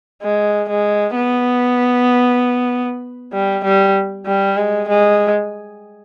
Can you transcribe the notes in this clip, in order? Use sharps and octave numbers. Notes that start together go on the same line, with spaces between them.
G#3
G#3
B3
G3
G3
G3
G#3
G#3